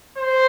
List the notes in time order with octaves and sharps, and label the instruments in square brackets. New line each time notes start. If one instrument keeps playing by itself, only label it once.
[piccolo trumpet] C5